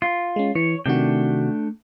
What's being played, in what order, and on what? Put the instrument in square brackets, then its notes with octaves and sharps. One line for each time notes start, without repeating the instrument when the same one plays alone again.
[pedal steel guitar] F4
[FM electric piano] G#3 C#4
[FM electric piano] E3 [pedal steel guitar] C#5
[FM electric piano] C3 D#3 F#4 [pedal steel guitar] A3 D4 G5